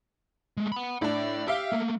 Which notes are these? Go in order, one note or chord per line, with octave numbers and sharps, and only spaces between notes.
G#3 A3
F#5 B5
A2 D4 D5
G4 E5 F5 G5
A3 A#3